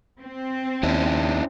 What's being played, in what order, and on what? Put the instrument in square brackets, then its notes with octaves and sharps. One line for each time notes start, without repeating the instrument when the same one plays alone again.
[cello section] C4
[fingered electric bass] D#2 [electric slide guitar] C#4 D4 E4